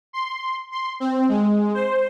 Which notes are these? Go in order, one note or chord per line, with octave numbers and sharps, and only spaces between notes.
C6
C6
C4
G#3
C5